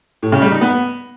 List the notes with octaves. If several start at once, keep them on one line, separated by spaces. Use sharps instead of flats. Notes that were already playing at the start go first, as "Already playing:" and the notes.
A2
C#3
G3
D#4
B3